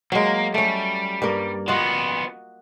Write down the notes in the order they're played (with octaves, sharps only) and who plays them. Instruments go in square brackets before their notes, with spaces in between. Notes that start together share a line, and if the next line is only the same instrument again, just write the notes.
[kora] F#3 G#3 [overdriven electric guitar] A#3
[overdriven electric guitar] G3 [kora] A3 C#4
[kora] G2 A#3 A#4
[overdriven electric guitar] F3 B3 [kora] F4 F#4 D#5